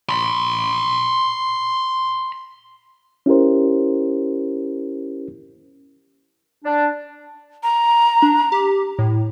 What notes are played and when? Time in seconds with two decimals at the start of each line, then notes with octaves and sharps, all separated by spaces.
0.09 B5 C6
3.26 C#4 E4 G4 A#4 C5
6.64 D4
7.63 A#5
8.22 D4
8.52 G4
8.99 A2